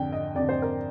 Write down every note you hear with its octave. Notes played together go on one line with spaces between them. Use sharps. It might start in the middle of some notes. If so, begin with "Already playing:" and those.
Already playing: F2 D3 G5
D#5
F2 D3 D5
C5
A#4